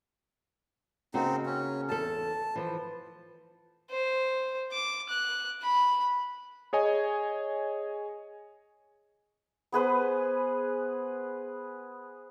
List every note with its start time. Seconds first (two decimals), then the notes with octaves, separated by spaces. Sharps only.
1.14 C#3 A#3 C4 D#4 F#4
1.46 C#4
1.89 E2 A4 A5
2.56 E3 F3
3.91 C5
4.71 D6
5.09 F#6
5.63 B5
6.73 G#4 C#5 D#5 G#5
9.72 B3 G#4 B4 C5